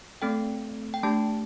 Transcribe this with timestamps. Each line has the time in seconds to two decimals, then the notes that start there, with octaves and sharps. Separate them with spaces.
0.22 A3 C4 A4 G5
0.94 G5
1.03 A3 D4 G4 A5